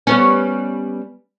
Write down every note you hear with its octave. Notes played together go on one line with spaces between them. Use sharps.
G3 B3 C#4